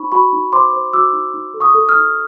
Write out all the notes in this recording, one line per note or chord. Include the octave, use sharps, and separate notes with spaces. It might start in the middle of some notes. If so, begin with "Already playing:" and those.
Already playing: D#4 C5 B5 C#6
F#4 B5 C#6
D#4
C5 C6 D6
C5
F#4 D6 E6
D#4
D#4
A4
C#6 D#6
A4
D#6 F6
D#4